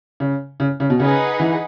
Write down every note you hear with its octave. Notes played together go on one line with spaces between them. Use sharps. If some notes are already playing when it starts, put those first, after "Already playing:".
C#3
C#3
C#3
B2
C#3 D#4 G#4 B4 F#5
E3